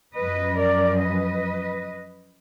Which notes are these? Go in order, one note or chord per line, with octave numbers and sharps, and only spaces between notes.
F#2 F3 B4 D#5
A#4 D5
B4 D#5